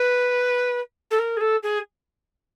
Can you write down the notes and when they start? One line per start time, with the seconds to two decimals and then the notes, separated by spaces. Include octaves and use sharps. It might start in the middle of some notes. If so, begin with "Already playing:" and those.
Already playing: B4
1.10 A4
1.18 A#4
1.36 G#4
1.40 A4
1.63 G#4